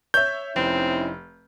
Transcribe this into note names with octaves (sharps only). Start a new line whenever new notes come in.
C#5 E5 G6
F1 C4 C#4 D#4 E4